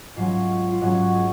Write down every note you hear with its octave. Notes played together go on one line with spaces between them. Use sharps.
G#2 F#3 C#4 F4
F4
G#2 F#3 C#4 F#4
G#4